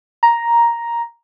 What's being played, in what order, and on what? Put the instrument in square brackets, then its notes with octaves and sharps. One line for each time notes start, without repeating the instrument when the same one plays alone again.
[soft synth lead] A#5